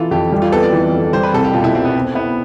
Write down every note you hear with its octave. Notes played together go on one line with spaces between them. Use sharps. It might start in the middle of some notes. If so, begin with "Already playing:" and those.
Already playing: E3 E4 F4 A4
F2 G4
G3
F4
B3 A4
D5
E3
F2
G3 C5
B4
C2 A4
G4
B2 F4
E4
C2 C4
B3
C4
B3 E4